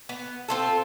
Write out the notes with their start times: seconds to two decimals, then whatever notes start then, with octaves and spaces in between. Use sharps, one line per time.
0.09 B3
0.48 C4 F4 A4